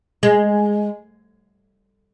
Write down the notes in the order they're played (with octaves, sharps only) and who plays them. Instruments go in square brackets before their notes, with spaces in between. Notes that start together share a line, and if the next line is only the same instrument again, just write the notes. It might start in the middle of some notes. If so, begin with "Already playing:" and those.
[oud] G#3